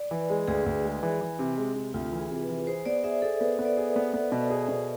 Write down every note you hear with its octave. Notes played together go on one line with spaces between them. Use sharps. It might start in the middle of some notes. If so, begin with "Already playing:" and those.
Already playing: D5
E3 B4
G#3
D2 G#4
D2
G#3
E3
E3
C3
G#3
C3
D2 F4
E3
G#4
C3
B4
E3
G#4 C5
B3 D5
G#4 E5
G#4 A4
B3 B4
B3
D5
G#4
B3
B3
B2
G#4
B2